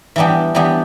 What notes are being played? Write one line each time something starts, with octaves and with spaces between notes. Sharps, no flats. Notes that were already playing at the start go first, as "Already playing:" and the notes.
E3 G3 B3 D4 G4
E3 G3 B3 D4 G4